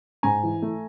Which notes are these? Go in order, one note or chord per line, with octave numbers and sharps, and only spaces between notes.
G#2 G#5 A#5
E3
A3